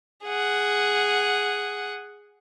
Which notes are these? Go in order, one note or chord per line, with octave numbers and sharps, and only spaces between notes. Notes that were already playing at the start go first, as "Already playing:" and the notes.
G#4 F#5